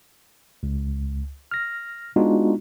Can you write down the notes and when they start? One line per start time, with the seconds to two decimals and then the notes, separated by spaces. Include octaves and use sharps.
0.63 C#2
1.51 F6 A#6
2.16 G#3 B3 D4 D#4 F4 F#4